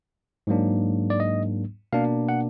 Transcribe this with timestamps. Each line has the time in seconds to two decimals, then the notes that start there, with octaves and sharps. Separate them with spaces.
0.47 G#2 F#3 A#3 D4
1.10 D5
1.20 D#5
1.93 B2 A#3 D4 F5
2.29 F#5